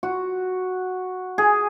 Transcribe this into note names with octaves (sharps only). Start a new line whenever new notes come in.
F#4
G#4